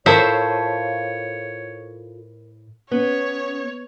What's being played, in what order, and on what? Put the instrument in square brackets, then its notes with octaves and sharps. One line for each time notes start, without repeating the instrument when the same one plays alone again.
[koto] A2 C5 E5 [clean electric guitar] F4 A4 [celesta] A#4 [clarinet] C#5
[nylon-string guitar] B3 [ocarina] C#4 [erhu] C#5